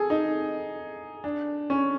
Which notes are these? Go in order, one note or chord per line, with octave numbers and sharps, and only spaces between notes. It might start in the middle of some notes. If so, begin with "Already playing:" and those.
Already playing: G#4 A4
D#4
D4
C#4